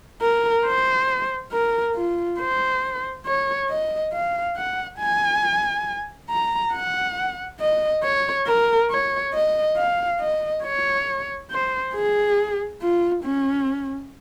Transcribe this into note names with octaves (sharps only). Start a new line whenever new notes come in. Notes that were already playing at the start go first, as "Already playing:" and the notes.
A#4
C5
A#4
F4
C5
C#5
D#5
F5
F#5
G#5
A#5
F#5
D#5
C#5
A#4
C#5
D#5
F5
D#5
C#5
C5
G#4
F4
C#4